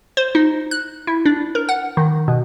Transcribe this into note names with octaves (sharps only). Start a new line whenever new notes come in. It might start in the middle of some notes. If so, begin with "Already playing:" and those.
C5
D#4
F#6
E4
D4
A#4
F#5
D#3
B2